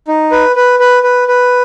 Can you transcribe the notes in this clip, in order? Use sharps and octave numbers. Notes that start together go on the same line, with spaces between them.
D#4
B4
B4
B4
B4
B4